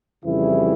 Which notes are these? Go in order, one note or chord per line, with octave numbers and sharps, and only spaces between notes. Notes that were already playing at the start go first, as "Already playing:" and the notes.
F2 C#3 E3 G3 E4